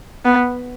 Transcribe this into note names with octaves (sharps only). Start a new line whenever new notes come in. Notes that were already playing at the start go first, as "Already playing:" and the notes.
B3